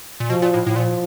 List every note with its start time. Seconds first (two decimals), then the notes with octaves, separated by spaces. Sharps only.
0.20 A#2
0.30 B2 F3
0.42 A#2
0.54 A2
0.66 A2
0.76 A#2 F3